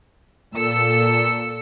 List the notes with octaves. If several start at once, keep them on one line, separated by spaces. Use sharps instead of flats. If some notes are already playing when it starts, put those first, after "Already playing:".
A#2 A4 E6 C#7